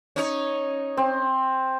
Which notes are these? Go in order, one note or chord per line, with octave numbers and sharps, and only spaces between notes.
C#4 D#4 C#5
C4